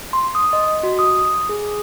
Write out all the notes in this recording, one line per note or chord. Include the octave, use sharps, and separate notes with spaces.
C6
D#6
D#5
F#4
D#6
G#4